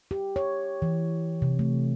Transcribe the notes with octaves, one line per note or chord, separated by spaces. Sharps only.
G4
C#5
E3
C3
A3